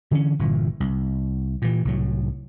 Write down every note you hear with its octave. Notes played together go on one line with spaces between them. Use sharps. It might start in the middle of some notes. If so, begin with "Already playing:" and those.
D3 E3 A#3 C#4
G1 A#2 E3
C2
A#2 E3
C2 A2 F#3